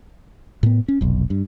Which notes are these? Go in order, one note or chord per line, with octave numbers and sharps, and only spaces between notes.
A2 B3
C#4
F1 B1
G2